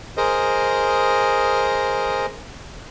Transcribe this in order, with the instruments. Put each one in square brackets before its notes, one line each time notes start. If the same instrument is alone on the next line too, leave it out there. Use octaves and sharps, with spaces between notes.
[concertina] G#4 A#4 C5 D#5